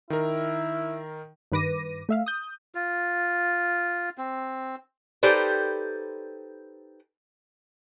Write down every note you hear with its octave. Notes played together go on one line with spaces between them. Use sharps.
D#3 E4 A#4
G2 D#3 B4 D6 A#6 D#7
A3 E5 F5
D#6 G6
F4
C4
D#4 G4 A4 B4 C5 D5